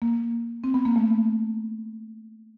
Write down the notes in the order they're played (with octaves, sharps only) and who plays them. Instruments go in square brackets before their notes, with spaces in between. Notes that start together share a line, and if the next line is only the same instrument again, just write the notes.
[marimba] A#3
C4
B3
A#3
A3